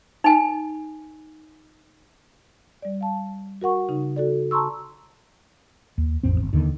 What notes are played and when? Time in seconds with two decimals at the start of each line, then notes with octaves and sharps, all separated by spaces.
0.24 D#4 G#5
2.82 G3 D5
3.01 F5 A5
3.61 F#4 A#4 F#5 C#6
3.89 C#3 D#4
4.16 F#4 A4 D5
4.51 A5 A#5 C6 C#6 E6
5.98 D#2
6.23 A1 F2 C4
6.40 G1
6.53 D#2 D3 D#3